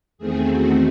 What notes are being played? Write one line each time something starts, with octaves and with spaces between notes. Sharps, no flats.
E2 D#3 A3 C4 G#4
F#4